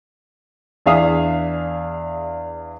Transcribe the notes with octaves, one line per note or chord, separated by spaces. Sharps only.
E2 D4 G#4 E5 F5 D#6